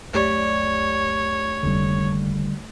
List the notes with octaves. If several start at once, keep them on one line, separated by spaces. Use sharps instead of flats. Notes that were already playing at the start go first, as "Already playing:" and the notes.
C#2 F#2 A3 G4 C#5 D5
F1 D#2 D3 G3